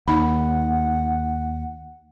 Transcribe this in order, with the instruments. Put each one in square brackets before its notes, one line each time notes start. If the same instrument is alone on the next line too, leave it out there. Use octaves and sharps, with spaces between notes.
[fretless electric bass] D#2 [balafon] D#4 B5 [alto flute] F#5